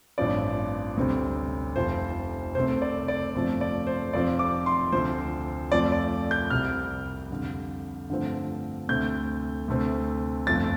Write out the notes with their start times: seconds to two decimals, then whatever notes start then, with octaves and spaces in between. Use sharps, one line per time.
0.18 A1 G2 F3 C4 D5
0.97 D2 C3 G3 C4
1.76 F1 F2 F3 C5
2.55 C2 C3 A3 C4 C5
2.82 D5
3.08 D5
3.34 G1 F2 C3 F3 A3
3.61 D5
3.87 C5
4.13 F1 F2 F3 C4 D5
4.39 D6
4.66 C6
4.92 D2 C3 F3 C5
5.71 F2 F3 A3 C4 D5
5.92 D5
6.31 G6
6.50 C2 C3 G3 F6
7.30 F2 D3 G3
8.10 G2 D3 F3 A3 C4
8.89 D2 C3 A3 C4 G6
9.68 D2 C3 A3 C4
10.47 G1 F2 F3 A3 A6